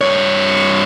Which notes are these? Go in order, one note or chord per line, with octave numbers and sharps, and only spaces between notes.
G2 C#5